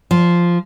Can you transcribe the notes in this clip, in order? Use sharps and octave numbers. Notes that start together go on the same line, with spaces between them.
F3